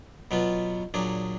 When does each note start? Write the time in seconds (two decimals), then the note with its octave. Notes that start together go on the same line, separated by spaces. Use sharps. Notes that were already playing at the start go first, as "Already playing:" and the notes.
0.31 B2 F#3 B3 F4
0.94 A#2 F#3 D4 G#4